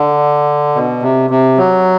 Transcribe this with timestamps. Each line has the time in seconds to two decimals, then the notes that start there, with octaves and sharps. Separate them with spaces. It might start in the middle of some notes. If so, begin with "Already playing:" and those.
Already playing: D3
0.75 B2
1.02 C3
1.30 C3
1.58 F#3